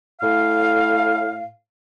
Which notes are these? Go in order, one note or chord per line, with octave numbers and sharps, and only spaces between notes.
A2 F5